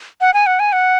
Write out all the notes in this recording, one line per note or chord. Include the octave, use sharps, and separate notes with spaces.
F#5
G#5
F#5
G#5
F#5